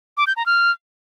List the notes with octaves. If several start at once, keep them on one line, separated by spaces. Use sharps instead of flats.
D6
G6
A#5
F6